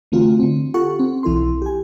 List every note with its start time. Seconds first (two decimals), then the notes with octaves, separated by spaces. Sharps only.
0.12 D3 E3 A3 C4 F4 F#4
0.40 D3 C4
0.74 F4 G4 A4 F#5 C#6
0.99 C4
1.23 B1 E3 E4 A4 C6
1.62 G4 G#5